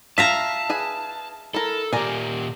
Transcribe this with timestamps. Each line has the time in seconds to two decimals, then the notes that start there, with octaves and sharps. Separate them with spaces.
0.18 F4 E5 F5 A5 A#5
0.70 G#4 B4 G#5
1.54 E4 A4 A#4
1.93 A#2 G4 A#4 D5 G#5